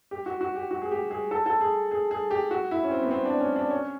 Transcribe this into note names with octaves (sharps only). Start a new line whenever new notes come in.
G4
F#4
F#4
G4
F#4
G#4
G4
G#4
A4
A4
G#4
G#4
G#4
G4
F#4
E4
C#4
C4
B3
C4
D4
C#4
D4
C#4